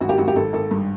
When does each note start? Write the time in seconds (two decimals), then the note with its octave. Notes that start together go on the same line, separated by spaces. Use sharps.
0.01 G#1 F#4
0.09 G4
0.18 G#1 F#4
0.28 G4
0.36 G#1 A4
0.53 G#1 A4
0.71 G2